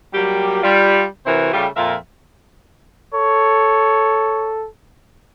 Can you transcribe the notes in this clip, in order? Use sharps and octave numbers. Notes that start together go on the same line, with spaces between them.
F#3 G3 A#3 G4
G3 F4
C3 E3 E4 F#4 A#4 C5
C#3 G3 A3 F4 G4
F2 A#2 F4 A#4 E5 F5
A4 C#5